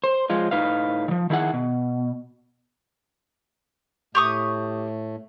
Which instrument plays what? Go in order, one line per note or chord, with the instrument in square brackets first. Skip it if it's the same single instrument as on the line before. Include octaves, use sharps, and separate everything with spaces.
[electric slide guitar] C5
F3 G#3 F4
A2 D#4 B4 F5
D#3 F3
D#3 E4 G#4 F#5
B2
[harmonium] A2 A3 [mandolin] G4 C#6 D#6